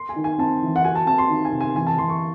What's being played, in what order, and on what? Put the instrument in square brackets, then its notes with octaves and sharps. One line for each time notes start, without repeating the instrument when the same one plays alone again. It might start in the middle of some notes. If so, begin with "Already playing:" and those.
Already playing: [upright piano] C6
G#5
[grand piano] D#3
[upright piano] G#5
[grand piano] C4 [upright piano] A5
[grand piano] E3
[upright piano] F#5
[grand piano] F#4 [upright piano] G#5
[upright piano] A5
[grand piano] C4 [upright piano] A5
[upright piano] C6
[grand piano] D#3
[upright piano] G#5
[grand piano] C3
[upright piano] G#5
[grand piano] E3 [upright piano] G#5
[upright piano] A5
[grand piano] E3 [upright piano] C6
[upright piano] C#6